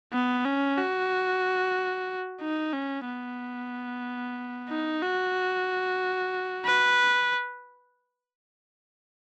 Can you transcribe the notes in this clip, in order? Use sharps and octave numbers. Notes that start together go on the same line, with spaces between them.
B3
C#4
F#4
D#4
C#4
B3
D#4
F#4
B4